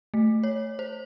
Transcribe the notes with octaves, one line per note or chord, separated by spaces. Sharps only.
A3
C#5
C5